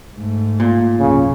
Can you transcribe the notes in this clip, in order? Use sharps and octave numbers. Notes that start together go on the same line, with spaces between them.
G#2 A3
A#2
C2 F#2 C#3